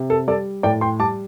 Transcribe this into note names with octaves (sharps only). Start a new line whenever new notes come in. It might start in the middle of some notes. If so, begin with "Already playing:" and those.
Already playing: C3
A4
G3 A4 D5
A2 D5 G5
G5 C6
G3 A5 D6